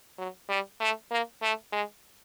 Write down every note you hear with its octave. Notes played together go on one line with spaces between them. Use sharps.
F#3
G3
A3
A#3
A3
G#3